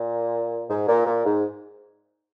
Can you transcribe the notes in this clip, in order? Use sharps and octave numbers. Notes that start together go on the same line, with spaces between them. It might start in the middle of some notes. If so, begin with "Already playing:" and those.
Already playing: A#2
G#2
A#2
A#2
G#2